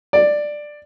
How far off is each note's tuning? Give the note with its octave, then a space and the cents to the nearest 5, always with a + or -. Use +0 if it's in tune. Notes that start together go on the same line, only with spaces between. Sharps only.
D5 +10